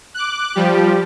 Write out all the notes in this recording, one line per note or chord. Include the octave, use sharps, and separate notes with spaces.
D6 F#6
F3 G3 G4